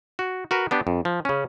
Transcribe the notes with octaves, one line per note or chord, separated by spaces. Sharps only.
F#4
F#4 A#4 B4
B3 D4 G4
F2
F3
C#3 C#4